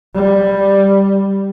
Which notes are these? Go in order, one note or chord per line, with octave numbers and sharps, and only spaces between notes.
G3